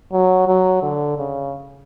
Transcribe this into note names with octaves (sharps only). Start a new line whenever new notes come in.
F#3
F#3
D3
C#3